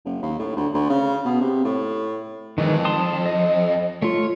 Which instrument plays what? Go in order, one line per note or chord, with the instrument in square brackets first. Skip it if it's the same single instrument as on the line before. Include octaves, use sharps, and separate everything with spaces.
[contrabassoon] F#1
D#2
A2
D2
D2
C#3
B2
C3
A2
[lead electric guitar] F2 [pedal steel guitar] D#3 E3 G#3
[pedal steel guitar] A5 C6 D#6
D#5
[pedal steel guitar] A3 F4 [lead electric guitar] C#5